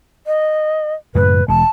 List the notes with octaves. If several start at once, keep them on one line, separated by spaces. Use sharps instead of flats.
D#5
F#2 A2 C#3 B4
E1 G#3 A5